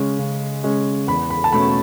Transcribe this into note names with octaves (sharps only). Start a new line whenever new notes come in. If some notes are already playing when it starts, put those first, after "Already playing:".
Already playing: C#3 G#3 C#4
C#3
G#3 C#4
E2 B5
B5
A5
B2 A3 C#4 B5